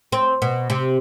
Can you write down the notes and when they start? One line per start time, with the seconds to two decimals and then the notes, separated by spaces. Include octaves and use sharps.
0.12 C4
0.42 B2
0.70 C3